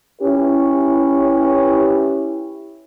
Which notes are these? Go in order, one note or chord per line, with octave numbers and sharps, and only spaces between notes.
C#4 E4 G4 B4